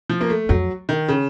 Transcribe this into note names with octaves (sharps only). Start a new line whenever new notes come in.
F3
A#3
A3
F2 F#3
D#3
C#3